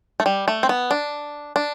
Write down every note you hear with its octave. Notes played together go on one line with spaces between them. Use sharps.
A3
G3
A3
C4
B3
D4
D4